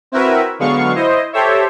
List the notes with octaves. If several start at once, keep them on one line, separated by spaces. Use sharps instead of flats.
C4 E4 F#4 A#4 B4 E5
D3 F#3 G#3 B3 F5 C#6
E4 C5 D#5
G4 A4 C5 C#5 E5